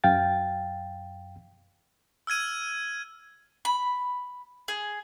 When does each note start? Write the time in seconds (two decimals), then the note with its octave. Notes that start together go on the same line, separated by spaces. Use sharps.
0.04 F#2 F5 G5 A6
2.27 E6 F6 G#6 D#7
3.65 B5
4.68 G#4